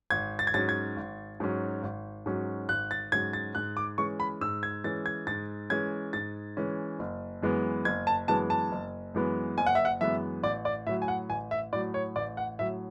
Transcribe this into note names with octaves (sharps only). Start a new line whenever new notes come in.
G#1 G#6
A6
G#6
G#2 F#3 C#4 A6
G#6
G#1
G#2 F#3 C#4
G#1
G#2 F#3 C#4
G#1 F#6
A6
G#2 F#3 C#4 G#6
A6
G#2 F#6
D6
E3 G#3 C#4 C#6
B5
G#2 E6
G#6
E3 G#3 C#4 A6
G#6
G#2 A6
E3 G#3 C#4 G#6
G#2 A6
E3 G#3 C#4
F#1
F#2 E3 G#3 B3
F#1 G#6
A5
F#2 E3 G#3 B3 A5
A5
F#1
F#2 E3 G#3 B3
F#1 G#5
F#5
E5
F#5
F#2 E3 G#3 B3 E5
A1 D5
D5
A2 F#3 E5
G#5
F#5
A1 G#5
E5
A2 F#3 D5
C#5
A1 D5
F#5
A2 F#3 E5